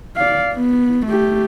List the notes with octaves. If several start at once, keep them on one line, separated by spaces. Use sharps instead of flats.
D5 F5
B3
A3 G4